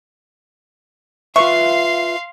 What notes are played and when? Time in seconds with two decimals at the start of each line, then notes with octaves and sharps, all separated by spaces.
1.36 F4 B4 E5 F5 C6 C#6